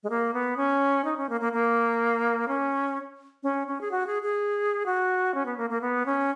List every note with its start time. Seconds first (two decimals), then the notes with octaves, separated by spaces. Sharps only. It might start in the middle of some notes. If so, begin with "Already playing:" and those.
0.03 G#3
0.10 A#3
0.33 B3
0.57 C#4
1.04 D#4
1.17 C#4
1.29 A#3
1.41 A#3
1.53 A#3
2.48 C#4
3.43 C#4
3.67 C#4
3.81 G#4
3.91 F#4
4.07 G#4
4.22 G#4
4.86 F#4
5.34 C#4
5.46 B3
5.57 A#3
5.70 A#3
5.81 B3
6.06 C#4